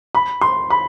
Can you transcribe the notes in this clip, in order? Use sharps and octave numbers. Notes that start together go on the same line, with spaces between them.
B5
C6
B5